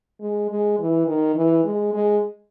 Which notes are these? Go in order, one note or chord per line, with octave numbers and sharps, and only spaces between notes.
G#3
G#3
E3
D#3
E3
G#3
G#3